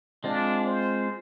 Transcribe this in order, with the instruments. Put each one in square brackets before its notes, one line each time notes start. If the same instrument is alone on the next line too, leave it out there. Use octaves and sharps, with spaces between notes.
[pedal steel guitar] G#3 C4 F4 [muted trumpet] D4
[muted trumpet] C5